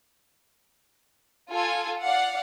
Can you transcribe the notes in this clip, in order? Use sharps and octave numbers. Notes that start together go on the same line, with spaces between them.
F4 A4 G#5
D5 F5 F#5